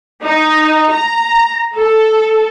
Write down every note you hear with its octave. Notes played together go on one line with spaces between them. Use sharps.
D#4
A#5
A4